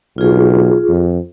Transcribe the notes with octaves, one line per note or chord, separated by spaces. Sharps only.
B1 F4 G#4
F2